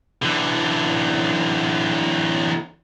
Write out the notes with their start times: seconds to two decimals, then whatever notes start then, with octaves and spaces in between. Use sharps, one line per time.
0.22 D3 E3